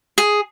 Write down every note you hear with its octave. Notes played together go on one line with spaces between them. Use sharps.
G#4